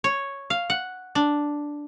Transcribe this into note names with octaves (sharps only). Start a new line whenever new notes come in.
C#5
F5
F#5
D4